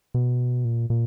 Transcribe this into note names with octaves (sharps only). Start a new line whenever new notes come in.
B2
A#2
A#2